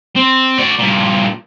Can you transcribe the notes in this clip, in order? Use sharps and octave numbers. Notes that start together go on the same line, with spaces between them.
C4
F#4 D5
G2 A#2